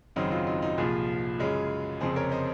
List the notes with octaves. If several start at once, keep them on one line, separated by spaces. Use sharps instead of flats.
G#1 F#2 C#3 F#3 C4 D#4
F4
D#4
D#4
C2 A#2 F3 F4 G#4
F#2 C#3 G#3 C#4
F#1 F2 C3 G#4 C5
A#4 C#5
C5 D#5